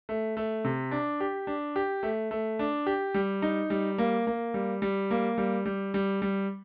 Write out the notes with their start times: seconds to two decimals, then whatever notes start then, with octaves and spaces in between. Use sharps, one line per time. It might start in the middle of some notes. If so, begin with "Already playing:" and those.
0.09 A3
0.37 A3
0.64 C3
0.91 D4
1.20 G4
1.47 D4
1.76 G4
2.03 A3
2.31 A3
2.59 D4
2.86 G4
3.14 G3
3.42 D#4
3.70 G3
3.98 A#3
4.27 A#3
4.54 G3
4.82 G3
5.11 A#3
5.38 G3
5.65 G3
5.94 G3
6.22 G3